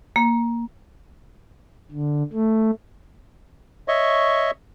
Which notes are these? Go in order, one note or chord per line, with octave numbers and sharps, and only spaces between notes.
A#3
D3
A3
C#5 D#5 E5 C#6